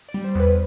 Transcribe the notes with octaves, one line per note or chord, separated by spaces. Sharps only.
D5
G3
C5
E2 B4